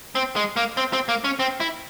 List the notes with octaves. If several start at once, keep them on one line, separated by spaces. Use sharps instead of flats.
C4
G#3
A#3
C4
C4
A#3
C#4
C4
E4